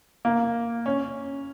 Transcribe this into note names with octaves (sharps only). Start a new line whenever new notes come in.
A#3
C#4